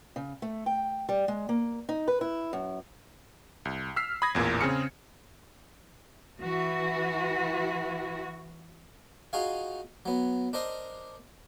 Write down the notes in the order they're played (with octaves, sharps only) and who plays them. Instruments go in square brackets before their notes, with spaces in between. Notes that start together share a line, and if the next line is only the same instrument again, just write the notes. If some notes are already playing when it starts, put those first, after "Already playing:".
[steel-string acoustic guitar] C#3
A3
G5
G3
G#3
A#3
D#4
B4
E4
F#2
[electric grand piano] C2
E6 F6 B6 C7
B5 D#6 G#6 A#6
A1 E2 A#2 A#3
C#3 C4 G#4 F6 C#7
[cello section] E3 F#4
[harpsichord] D#4 F4 F#4 G#4 F5
F#3 B3
D4 A#4 C5 D#5